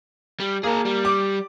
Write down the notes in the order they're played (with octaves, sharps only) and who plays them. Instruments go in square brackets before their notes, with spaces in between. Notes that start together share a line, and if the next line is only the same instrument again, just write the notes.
[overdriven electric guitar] G3
[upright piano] A#3 [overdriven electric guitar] G#4 A#4
[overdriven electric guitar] G3
[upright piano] D6